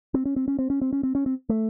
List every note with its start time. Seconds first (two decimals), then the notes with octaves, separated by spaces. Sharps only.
0.14 C4
0.25 C#4
0.36 C4
0.48 C#4
0.59 C4
0.70 C#4
0.81 C4
0.93 C#4
1.03 C4
1.15 C#4
1.26 C4
1.49 A3